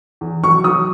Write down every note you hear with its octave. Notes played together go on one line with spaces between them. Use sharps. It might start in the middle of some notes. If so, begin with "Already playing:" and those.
E2
F#3 C#6
F#3 D#6